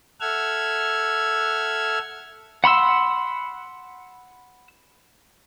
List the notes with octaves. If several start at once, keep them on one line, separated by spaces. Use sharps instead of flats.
A4 E5 F#5 E6 F6 G#6
F#5 B5 C6 E6